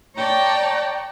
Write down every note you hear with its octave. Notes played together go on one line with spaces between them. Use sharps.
C#5 D5 G5 A5 A#5